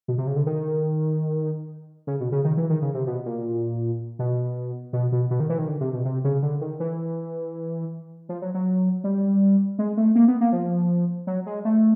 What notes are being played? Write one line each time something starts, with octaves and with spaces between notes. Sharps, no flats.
B2
C3
C#3
D3
D#3
C#3
B2
C#3
D#3
E3
D#3
C#3
C3
B2
A#2
B2
B2
B2
B2
D#3
E3
D#3
D3
C3
B2
C3
C#3
D3
D#3
E3
F3
F#3
F#3
G3
G#3
A3
A#3
B3
A#3
F3
F#3
G#3
A3